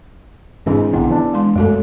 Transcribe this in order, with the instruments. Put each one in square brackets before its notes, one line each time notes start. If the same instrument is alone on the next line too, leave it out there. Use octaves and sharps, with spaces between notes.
[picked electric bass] G#2 E3 [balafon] C4 D4 G#4
[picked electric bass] A#1 D3 D#3 [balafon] B3 E4
[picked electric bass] E3 D4
[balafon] G#3 C6
[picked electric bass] F#2 [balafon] A3 F#4 A4